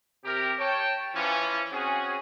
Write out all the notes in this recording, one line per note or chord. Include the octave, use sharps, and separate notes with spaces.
C3 G4 A#4
C#5 G5 A5
E3 F3 C#4
C4 C#4 F#4 G#4